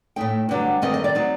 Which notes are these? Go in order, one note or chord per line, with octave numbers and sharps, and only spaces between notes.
A2 A3 D#4 G5
G2 D3 F#3
G2 D#3 A3 C4 D#5
D#5
D5
F#3 C4 D#4